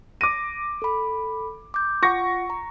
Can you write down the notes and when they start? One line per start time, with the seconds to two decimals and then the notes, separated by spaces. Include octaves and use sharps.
0.21 D6 A#6 D#7
0.82 A4 B5
1.74 D6 G6
2.03 F4 F#5 C#6 A#6
2.50 A#5